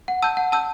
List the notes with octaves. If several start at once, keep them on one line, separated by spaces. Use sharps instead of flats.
F#5
A5 E6 G6
F#5
A5 E6 G6